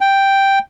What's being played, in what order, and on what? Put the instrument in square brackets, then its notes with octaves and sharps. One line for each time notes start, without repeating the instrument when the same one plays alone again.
[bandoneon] G5